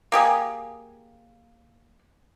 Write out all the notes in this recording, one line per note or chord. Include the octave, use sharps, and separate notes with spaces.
A#3 G4 G#4